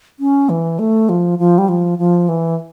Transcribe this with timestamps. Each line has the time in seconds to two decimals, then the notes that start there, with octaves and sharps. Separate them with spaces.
0.20 C#4
0.49 E3
0.79 A3
1.09 F3
1.39 F3
1.58 G3
1.69 F3
1.98 F3
2.29 E3